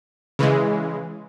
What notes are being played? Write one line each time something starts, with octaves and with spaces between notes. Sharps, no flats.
C#3 E3 G#3